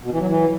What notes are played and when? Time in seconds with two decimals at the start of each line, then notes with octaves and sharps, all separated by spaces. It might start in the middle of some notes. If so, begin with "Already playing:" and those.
0.04 B2
0.12 E3
0.20 F#3
0.28 E3